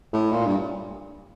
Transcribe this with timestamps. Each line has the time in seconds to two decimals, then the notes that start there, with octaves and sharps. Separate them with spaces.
0.13 A2
0.32 A#2
0.46 G2